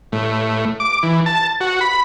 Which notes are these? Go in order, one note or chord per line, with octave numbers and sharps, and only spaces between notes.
A2
D6
E3
A5
F#4
B5